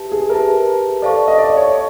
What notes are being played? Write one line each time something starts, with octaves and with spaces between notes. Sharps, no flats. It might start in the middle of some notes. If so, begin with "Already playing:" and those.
Already playing: G4 B4 E5 A5
G#4
G4 A#4 B4 E5 A5
A4 C5 D5 F5 A5 C#6
D#5
D5
C#5